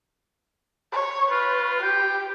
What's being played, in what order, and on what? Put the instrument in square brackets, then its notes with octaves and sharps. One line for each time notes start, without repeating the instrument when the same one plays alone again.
[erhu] C#5
[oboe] F4 [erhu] B4
[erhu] G4 [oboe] G5